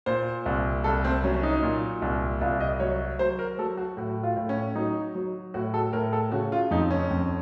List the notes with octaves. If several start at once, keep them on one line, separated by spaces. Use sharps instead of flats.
A#2 C5
C2
C2 A4
C4
F#3 C#4
C#4
D#4
A#2
C2
C2 F4
D#5
F#3 C#5
F#3 C5
A#4
F#3 A4
F#4
A2 F#4
F4
A2
C#4
F#3 D#4
F#3
A2 F#4
A4
A2 A#4
A4
C#3 F#4
F4
F2 D#4
C#4
F2